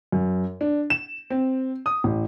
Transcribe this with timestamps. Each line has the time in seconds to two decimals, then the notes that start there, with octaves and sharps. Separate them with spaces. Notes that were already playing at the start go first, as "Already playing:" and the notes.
0.12 F#2
0.61 D4
0.90 E7
1.30 C4
1.86 D#6
2.04 A1